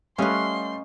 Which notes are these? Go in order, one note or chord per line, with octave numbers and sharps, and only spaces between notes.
G3 A3 C#4 B4 C#5 D#5 F5 C6